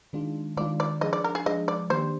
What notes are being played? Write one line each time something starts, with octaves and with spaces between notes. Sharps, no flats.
D#3 G#3 D4 F4
D#3 G#3 D4 F4 D5
D5
F3 G#3 D4 G#4 D#5
D5
A#4
G#4
F3 G#3 D4 G#4 D#5
D5
D#3 A#3 D4 G4 C5